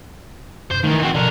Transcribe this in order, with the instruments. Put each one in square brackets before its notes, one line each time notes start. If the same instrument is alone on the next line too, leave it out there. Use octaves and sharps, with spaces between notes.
[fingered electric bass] F#2 C3 [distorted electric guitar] C5
[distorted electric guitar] D#3 E3 [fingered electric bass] A3
[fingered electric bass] E3 [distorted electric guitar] C4 F#4
[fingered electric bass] B2 F3 [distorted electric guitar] D3 A#4